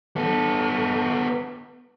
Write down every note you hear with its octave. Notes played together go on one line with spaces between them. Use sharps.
B3 A4